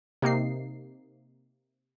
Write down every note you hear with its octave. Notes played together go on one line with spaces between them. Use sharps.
C3 A#3 D#4 C7